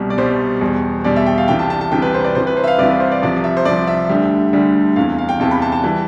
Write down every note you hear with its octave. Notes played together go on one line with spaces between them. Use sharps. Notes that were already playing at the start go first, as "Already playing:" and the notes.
Already playing: C2 B2 G3
D5
C2 B2 G3 C5
E2 B2 G3
E2 B2 G3 D5
E5
G5
F5
C2 C3 E3 G5
A5
A5
A5
C2 C3 E3 G5
B4
C5
D5
C2 C3 E3 C5
B4
C5
E5
F5
C2 C3 E3 D5
B4
C5
D5
C2 C3 F3 D5
E5
C5
C2 C3 F3 D5
E5
D2 D3 G3
D2 D3 G3
E2 C3 E3 F5
F5
G5
E2 C3 E3 A5
B5
A5
A5
E3 G3